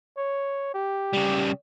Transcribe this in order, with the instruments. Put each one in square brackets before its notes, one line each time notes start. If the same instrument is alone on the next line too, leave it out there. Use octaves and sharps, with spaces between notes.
[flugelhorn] C#5
G4
[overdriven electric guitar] C#3 G3